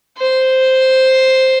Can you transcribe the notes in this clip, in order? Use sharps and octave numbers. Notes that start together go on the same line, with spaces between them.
C5